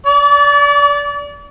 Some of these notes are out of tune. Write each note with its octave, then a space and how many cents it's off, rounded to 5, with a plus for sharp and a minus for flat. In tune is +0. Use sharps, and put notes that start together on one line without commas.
D5 -25 D6 -45